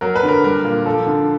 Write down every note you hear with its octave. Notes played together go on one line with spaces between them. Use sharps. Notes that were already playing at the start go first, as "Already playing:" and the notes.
F#3 A#4
B4
D3
A#4
G3 A#4
A#2
F3 A4
D3